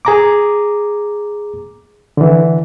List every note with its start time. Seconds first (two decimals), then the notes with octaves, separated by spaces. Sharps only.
0.05 G#4 A#5 D6
2.17 D3 E3